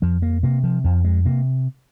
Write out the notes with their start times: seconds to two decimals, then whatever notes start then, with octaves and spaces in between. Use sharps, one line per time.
0.02 F2 F3
0.22 A#3
0.43 C3 A#3
0.63 F3
0.84 F2 F3
1.05 G#3
1.25 C3 A#3